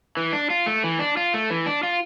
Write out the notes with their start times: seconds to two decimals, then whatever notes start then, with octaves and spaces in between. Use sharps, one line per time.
0.17 E3
0.32 D4
0.50 F4
0.66 A3
0.84 E3
0.99 D4
1.17 F4
1.34 A3
1.50 E3
1.66 D4
1.83 F4